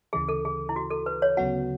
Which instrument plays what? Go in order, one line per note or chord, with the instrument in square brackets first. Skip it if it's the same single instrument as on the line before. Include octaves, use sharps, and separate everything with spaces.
[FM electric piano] D2 C#3 E3 [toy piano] G#4
[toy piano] A4
G#4
E4
F#4
A4
B4
C#5
[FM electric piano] D2 C#3 F#3 B3 F#4 [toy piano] F#5